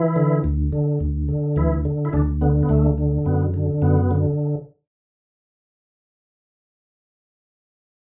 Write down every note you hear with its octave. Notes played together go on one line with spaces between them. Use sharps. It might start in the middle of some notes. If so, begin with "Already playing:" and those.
Already playing: E3 E4
D3
D2
D3
D2
D3
D2 E3 E4
D3
E4
D2 D3 D4
D3 B3
B3
D2 A3
D3
F#2 B3
D3
F#2 B3
D3